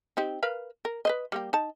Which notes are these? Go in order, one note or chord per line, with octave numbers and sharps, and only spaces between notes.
C4 D#4 G4
A#4 B4 F5
A#4
B4 C5 D#5
G3 A#3 G4
D#4 A5